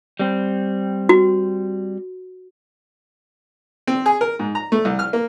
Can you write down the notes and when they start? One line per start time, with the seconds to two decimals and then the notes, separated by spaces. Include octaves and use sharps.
0.20 G3 C4
1.09 F#4
3.87 C4
4.06 G#4
4.21 A#4
4.39 G#2
4.55 A#5
4.72 A3
4.85 C2
4.99 F6
5.13 A#3